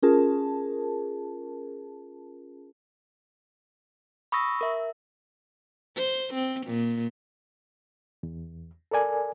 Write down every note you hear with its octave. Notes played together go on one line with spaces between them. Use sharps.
C#4 F4 G#4 A#4 A5
B5 C#6 D#6 E6 A#6
A#4 E5
C5
C4
A#2
E2
A4 A#4 D5 G#5